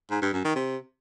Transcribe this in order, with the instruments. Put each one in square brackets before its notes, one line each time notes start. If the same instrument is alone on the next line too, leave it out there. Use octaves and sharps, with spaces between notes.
[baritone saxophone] G#2
G2
F#2
D#3
C3